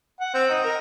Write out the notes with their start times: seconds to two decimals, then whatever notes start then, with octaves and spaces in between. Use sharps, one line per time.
0.20 F#5
0.34 C4
0.49 D#4
0.64 A#4